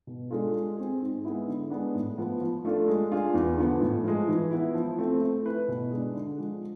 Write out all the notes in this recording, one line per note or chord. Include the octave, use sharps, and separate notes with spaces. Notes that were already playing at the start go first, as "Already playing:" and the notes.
B2
G#3 D4 F4 A4
G#3
C4 G#4
G#2
G#3 B3 E4
D3
G#3 B3 D4
A2
F3 B3
F3
A3 D4 F4 A4
G#3
D4 F4 G#4
E2
D3 F3 B3
A2
F3 G#3
E3
B3 E4
F3
A3 C4
A3
E4 B4
B2
G#3 D4
D3
F3 G#3